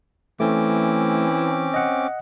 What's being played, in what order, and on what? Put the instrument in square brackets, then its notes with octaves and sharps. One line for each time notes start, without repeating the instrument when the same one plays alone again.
[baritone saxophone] E3 [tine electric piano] A3 [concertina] C4 C#4 D6
[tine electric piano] D#5 F#5